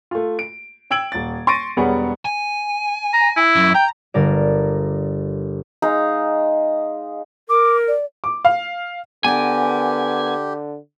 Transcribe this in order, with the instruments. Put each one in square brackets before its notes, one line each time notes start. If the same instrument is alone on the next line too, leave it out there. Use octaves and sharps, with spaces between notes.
[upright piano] A3 F4
D7
G5 E6 G#6 D7 F#7
D#1 A6
C6 C#6 A6 A#6 D7 D#7
E1 G3 B3 G#4 C#5 F#5
[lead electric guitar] G#5
[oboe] A#5
E4
[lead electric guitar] F#2
[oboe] G5 [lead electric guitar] A#5
[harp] G1 A#4 D5
[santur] G#3 D#4 F5
[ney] A#4 [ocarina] D6
[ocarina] D5
[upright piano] D6
F5
[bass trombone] D3 [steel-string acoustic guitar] B3 A#4 [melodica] G4 [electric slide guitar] G#5